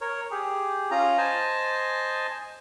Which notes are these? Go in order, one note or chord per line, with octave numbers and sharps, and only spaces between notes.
A#4 C#5
G4 G#4
C#4 F4 A#5
C5 D#5 G#5 A5